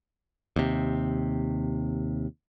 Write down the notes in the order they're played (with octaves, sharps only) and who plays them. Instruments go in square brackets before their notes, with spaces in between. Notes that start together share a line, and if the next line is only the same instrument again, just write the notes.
[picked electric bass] D#2 C3